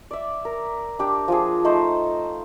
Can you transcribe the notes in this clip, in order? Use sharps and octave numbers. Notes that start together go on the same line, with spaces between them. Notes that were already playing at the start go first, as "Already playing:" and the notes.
D5 E5
A#4
D4 G4
F3 F4 G#4
A3 D#4 A4 C5